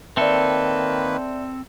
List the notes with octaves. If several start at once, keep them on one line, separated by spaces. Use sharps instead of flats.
D#3 A#3 C4 A4 B4 D5 E5